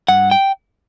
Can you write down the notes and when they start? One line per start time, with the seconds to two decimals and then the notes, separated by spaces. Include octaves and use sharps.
0.08 G2 F#5
0.31 G5